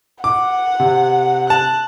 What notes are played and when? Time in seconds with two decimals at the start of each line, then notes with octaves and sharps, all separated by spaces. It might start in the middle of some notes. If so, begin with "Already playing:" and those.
0.24 F#5 D6
0.80 C3
1.50 A5 F#6